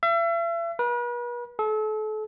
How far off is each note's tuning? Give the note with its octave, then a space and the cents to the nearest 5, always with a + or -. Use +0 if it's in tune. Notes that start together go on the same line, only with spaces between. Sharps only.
E5 +40
B4 -40
A4 -35